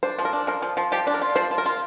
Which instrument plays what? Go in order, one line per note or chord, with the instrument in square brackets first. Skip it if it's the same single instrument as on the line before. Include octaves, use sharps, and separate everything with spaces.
[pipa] D4 [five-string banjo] C5
[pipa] F3
[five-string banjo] A#4
[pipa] D4
[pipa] F3 [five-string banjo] A#4
[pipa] F3
F3
[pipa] F3 [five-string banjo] G4
[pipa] D4
[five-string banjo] A#4
[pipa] F4
[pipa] F3 [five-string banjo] C5
[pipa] F4
[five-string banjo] A#4
[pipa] F4